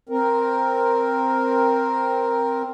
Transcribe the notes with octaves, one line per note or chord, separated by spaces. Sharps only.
C4 A#4